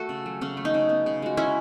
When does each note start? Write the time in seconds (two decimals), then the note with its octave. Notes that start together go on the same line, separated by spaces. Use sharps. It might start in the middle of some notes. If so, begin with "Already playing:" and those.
Already playing: A3 F#4 A4
0.09 C#3
0.26 F#3
0.41 C#3 C#4
0.57 A3
0.65 D#4
0.74 C#3
0.89 B3
1.06 C#3
1.22 G#3 F#4
1.37 C#3 C#4 E4